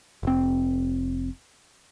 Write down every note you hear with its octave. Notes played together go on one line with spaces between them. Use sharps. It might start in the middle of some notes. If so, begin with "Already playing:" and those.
F1 C4